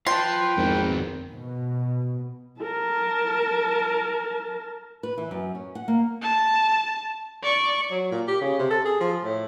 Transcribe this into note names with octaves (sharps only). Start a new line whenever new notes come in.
F4 B4 G5 A5 C6
G#1 F2 D#3
B2
A#4 A5
B4
E3
F#2
C#4
F#5
A#3
A5
D5 C#6
F#3
A#2
G4
C#3
C3
A4
G#4
F3
A2